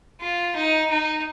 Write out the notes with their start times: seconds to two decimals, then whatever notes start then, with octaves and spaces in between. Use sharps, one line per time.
0.21 F4
0.56 D#4
0.90 D#4